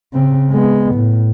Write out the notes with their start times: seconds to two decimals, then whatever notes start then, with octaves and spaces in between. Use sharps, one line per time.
0.13 C#3 C4
0.51 G#3 B3
0.95 A2